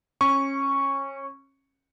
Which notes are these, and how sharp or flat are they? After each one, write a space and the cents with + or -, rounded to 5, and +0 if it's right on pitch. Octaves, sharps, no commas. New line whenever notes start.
C#4 -25 C#6 +0